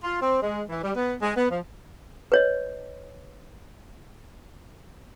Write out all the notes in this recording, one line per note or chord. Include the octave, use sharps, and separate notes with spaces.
F4
C4
G#3
E3
G3
B3
G#3
B3
F3
B4 C#5 D#5